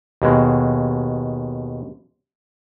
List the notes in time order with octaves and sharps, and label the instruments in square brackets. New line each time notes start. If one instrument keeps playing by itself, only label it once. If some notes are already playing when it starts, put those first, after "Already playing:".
[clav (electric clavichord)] D#2 B2 G#3